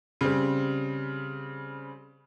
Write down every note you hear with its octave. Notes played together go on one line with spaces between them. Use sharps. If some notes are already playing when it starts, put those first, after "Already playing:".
C#3 G3 C4